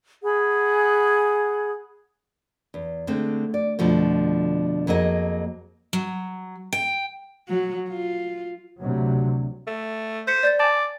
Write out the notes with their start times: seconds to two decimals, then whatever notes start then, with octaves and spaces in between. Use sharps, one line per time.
0.23 G#4 F#5 B5
2.74 E2
3.07 D3 G#3 A3 C4
3.54 D5
3.79 F2 B2 D3 F3 A3
4.87 F2 F#3 A#3 G#4 D#5
5.93 F#3
6.73 G5
7.48 F#3
7.89 F4
8.81 D2 C3 F#3
9.67 A3
10.27 C5 G6 B6 C#7
10.43 D5 G6 A6
10.59 D5 G#5 A5